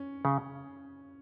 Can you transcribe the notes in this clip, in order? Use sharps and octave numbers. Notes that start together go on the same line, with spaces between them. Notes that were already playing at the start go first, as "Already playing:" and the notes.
Already playing: C#4
C#3